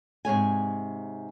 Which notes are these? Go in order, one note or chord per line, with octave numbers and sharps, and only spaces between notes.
G#2 C3 C#5 G#5